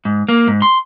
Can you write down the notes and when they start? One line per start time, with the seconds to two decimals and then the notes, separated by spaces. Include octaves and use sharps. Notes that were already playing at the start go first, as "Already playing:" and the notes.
0.05 G#2
0.28 A#3
0.47 G#2
0.62 C6